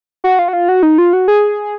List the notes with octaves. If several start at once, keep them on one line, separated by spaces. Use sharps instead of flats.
F#4
F4
F#4
F4
F#4
D#4
F4
F#4
G#4